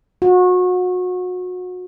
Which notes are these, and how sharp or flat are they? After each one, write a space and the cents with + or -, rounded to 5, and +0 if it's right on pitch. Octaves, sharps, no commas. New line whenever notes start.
F#4 -30